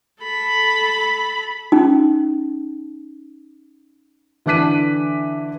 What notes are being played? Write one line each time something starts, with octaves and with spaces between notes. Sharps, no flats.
A4 B5
C#4 D#4
D3 E3 D6 F#6 B6 D#7